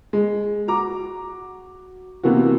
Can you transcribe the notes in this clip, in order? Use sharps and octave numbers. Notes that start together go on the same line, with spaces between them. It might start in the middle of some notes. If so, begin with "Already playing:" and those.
G#3
F#4 A#5 D6
C3 E3 A#3 B3 F#4